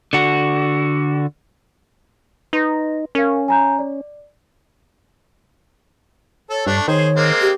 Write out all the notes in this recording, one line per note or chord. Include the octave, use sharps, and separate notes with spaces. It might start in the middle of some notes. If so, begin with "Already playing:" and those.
D3 F#4
D#4 B4 C6 A#6
C#4 A#4 F5
G#5 A#5 G6
D5
A4 C#5
G2 A3 D4
D#3 G#4 C5 C#5
G#3 A#3 C4
G4